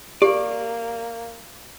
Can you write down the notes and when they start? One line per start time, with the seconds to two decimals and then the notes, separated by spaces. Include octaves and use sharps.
0.22 A#3 G4 D5